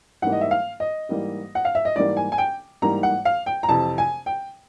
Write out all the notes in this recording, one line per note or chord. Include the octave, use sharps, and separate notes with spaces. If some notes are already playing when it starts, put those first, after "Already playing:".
G#2 E3 G3 A#3 F#5
D#5
E5
F5
D#5
G#2 E3 G3 A#3
F#5
F5
E5
D#5
G#2 E3 G3 A#3 D5
G#5
G#5
G5
G#2 E3 G3 A#3 A#5
F#5
F5
G5
A#5
F2 C3 E3 A5
G#5
G5